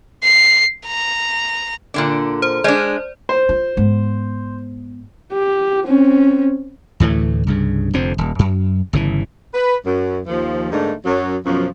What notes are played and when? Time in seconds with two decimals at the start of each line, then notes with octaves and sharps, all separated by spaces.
0.24 C7
0.87 A#5
1.94 A#2 D3 D4
2.42 C5
2.64 G#3 D4 C5 D5
3.29 C5
3.49 F4
3.77 G#2 B3
5.32 G4
5.85 C4 C#4
7.00 D2 A2 E3 A3
7.47 C2 G2 C#3
7.93 F1 F2 D3 C4
8.18 D#1
8.39 F#2
8.93 G1 C#3 E3
9.54 B4
9.85 F#2
10.27 D#2 F3
10.71 G#2 D3 A3 A#3 D4 D#4
11.05 F#2 F#3
11.45 F#2 B2 F3